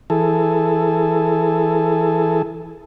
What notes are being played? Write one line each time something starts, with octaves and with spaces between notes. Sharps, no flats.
E3 G#4 A4